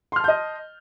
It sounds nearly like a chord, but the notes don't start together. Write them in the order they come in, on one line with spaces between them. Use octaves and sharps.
C6 F6 A5 G6 D#5